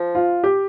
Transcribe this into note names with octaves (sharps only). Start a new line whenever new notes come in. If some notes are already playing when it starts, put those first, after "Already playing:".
Already playing: F3
F4
G4